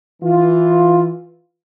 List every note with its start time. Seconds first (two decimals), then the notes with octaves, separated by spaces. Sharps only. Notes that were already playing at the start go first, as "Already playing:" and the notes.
0.22 E3 F4